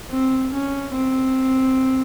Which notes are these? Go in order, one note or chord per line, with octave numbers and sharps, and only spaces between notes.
C4
C#4
C4